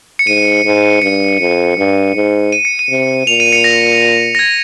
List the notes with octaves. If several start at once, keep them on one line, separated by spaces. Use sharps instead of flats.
C#7
G#2 D#7
G#2
G2 C#7
F2
G2
G#2
D#7
C#7
D#7
C3
A#2 F7
D#7
C#7
A#6
A#6
G#6